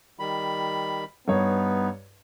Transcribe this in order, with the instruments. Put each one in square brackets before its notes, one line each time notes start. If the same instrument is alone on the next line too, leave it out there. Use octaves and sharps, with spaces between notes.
[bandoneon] D#3 G3 B5
[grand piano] G2 C#5 [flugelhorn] B3 [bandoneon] D#4